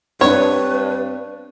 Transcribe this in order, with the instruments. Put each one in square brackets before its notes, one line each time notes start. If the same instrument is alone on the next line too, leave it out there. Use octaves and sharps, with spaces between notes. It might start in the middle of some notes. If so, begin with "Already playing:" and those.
[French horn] G2 [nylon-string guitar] C4 D4 [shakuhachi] B4 [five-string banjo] C#5